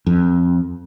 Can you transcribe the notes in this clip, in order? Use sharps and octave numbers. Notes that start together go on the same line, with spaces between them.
F2